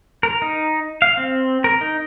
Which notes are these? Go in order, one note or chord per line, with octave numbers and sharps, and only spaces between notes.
A#4
D#4
F5
C4
A#4
D#4